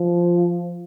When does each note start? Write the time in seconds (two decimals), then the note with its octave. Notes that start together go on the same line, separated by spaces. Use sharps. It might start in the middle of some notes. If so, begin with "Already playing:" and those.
Already playing: F3